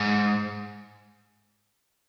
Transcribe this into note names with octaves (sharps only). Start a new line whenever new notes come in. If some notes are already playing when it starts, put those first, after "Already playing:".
Already playing: G#2